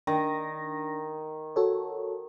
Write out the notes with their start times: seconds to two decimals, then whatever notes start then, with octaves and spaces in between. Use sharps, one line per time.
0.07 D#3 D4 A#6
1.56 F#4 A4 C#5